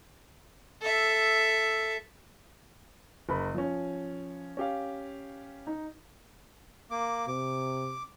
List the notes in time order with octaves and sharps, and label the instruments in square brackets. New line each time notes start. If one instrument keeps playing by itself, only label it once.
[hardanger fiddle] A4 E5
[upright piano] F#1 A#4 B5
F3 C#4
C#4 G4 F5
D#4
[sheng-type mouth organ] A#3 D6
[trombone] C3 [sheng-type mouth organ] D6